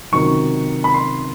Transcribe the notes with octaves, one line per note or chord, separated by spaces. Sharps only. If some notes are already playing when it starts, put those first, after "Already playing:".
C#2 C3 D#3 F#3 C#6
B5
C6